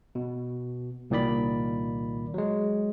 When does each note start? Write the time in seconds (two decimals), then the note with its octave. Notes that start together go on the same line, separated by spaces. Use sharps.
0.15 B2
1.10 C2 A#2 D#3 D5 B5
2.34 F#3 G#3